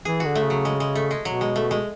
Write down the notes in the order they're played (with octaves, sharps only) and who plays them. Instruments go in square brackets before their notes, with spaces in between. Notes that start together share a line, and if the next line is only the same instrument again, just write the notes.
[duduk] E3 [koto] G#4
[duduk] D3 [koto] F#4
[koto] A3
[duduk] C#3
[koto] F#3
G#3
G#3
A3
G#3
[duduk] B2 [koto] F#3
[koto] G#3
A3
G#3